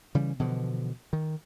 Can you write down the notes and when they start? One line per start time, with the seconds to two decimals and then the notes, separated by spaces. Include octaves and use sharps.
0.15 C#3 E3 G3
0.39 B2 D3 E3 F3
1.13 D#3